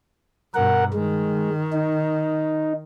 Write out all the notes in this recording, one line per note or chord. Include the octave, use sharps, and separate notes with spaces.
G2 B2 A#4 F#5
D#3 G#3
D#4